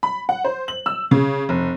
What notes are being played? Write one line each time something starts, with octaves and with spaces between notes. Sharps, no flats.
B5
F#5
C5
F#7
E6
C#3
F1